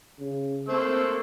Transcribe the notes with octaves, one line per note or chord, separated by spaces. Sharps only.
C#3
A3 A#3 C4 C5 E6